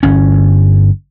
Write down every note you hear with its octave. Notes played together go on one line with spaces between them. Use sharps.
G1 C#4